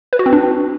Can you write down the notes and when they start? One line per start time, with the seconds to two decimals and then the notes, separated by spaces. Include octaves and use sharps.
0.13 B4
0.19 F#4
0.26 C4
0.33 D4